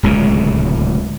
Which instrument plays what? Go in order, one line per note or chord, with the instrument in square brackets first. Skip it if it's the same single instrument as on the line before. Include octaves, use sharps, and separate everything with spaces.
[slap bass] D1 C#2 C3 G#3